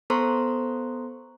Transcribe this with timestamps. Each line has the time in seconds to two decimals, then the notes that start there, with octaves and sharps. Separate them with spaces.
0.10 B3 A4 C5 A#5 C6 C#6